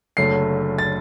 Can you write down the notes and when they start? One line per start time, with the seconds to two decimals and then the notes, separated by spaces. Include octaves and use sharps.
0.17 F#1 F#2 D3 F#3 A3 C7
0.78 A6